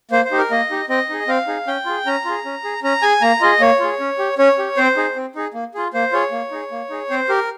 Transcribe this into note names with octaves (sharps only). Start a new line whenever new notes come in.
A#3 C5
C5
D#4 G4
A#4
A#3 D#5
D#4 G4
C4 D#5
D#4 G#4
C4 F5
D#4 G#4
C#4 G5
F4 G#4
C#4 A#5
F4 G#4
C#4
G#4
C#4 A#5
G#4 G#5
A#3 A#5
F4 G#4 D#5
A#3 C#5
F4 G#4
C#4
G4
C#4 C#5
G4
C4 C5
D#4 G#4
C4
D#4 G#4
A#3
F4 G#4
A#3 C5
F4 G#4 C#5
A#3
D#4 G#4
A#3
D#4 G#4
C4 C5
G4 A#4